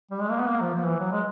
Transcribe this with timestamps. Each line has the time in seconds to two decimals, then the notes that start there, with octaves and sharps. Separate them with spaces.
0.11 G3
0.21 G#3
0.30 A#3
0.40 B3
0.49 A#3
0.61 F3
0.74 F3
0.86 E3
0.99 F#3
1.12 G#3